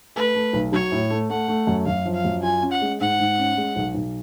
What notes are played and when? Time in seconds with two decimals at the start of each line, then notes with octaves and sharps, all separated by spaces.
0.16 A3 B4
0.35 A3
0.53 B1
0.72 F#3 C#5
0.92 A2
1.10 A3
1.30 A3 F#5
1.48 A3
1.67 F#2
1.86 F#2 F5
2.05 F3
2.14 F5
2.25 F#2
2.43 F4 G#5
2.62 C#4
2.72 F#5
2.81 G#3
3.00 G#2 F#5
3.20 G#2
3.38 C#4
3.57 G#3
3.76 B1
3.95 B1